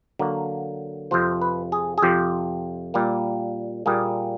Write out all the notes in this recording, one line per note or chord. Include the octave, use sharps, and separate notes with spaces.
D3 F#3 A#3
F2 C3 F3 C5
B4
G#4
G#4
F2 C3 F3 G4
A#2 G3 A#3
A#2 G3 A#3 G#4